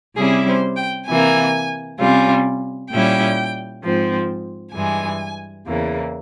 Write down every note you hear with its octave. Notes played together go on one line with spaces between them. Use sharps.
C3 G3 C#4 E4 G#4
C5
G5
C3 E3 A#3 G#5
C3 G3 C#4 F4
A#2 G3 C#4 E4 G5
G#2 F3 C4
G2 E3 G#3 G#5
E2 C#3 E3 A#3